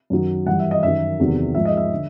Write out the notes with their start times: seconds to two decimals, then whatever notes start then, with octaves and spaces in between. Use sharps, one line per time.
0.10 F#2 D#3 F#3
0.46 G2 E3 G3 F#5
0.59 E5
0.71 D#5
0.83 F#2 D#3 F#3 E5
1.19 E2 C3 D#3 F#3
1.55 G#2 F3 E5
1.65 D#5
1.77 E5
1.93 D3